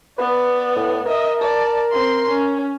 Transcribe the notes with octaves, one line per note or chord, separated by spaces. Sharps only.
B3 B4 D5
A2
A#4 D#5 E5
D5 A5
C4 C6
C#4